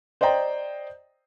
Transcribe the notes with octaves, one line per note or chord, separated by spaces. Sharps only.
C5 D5 D#5 G5 A#5